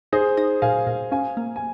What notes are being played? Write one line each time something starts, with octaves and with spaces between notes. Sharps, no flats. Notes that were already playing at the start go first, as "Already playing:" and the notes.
D#4 G#4 C5
D#4
A#2 F5 G#5
A#2
C#4 F5 G#5
A#3
G#5